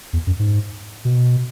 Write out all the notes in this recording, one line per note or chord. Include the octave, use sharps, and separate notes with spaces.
E2
F#2
G#2
B2